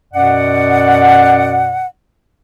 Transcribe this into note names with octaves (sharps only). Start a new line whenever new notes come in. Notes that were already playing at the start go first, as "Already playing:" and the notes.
F#2 B2 D5 F#5